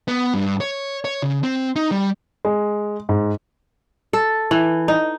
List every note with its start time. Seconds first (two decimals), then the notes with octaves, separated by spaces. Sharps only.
0.08 B3
0.34 G2
0.60 C#5
1.05 C#5
1.23 C#3
1.43 C4
1.76 D#4
1.91 G3
2.45 G#3
3.09 G#2
4.13 A4
4.51 E3
4.88 D#4